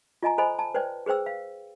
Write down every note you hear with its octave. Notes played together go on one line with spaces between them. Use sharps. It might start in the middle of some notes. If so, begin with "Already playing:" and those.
F4 D#5 G#5 A#5
A4 C5 D#5 G#5 B5
A5
B4 C5 D5 G5
G#4 B4 C5 G5 E6
F5